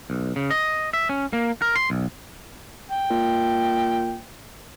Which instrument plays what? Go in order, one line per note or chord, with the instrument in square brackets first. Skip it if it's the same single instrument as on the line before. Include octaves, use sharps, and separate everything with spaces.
[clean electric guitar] B1
C#3
D#5
E5
C#4
A#3
A#4
C6
B1
[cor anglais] G5
[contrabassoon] A#2